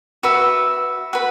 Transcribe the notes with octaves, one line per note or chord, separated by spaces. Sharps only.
F#4 B4 E5
F#4 B4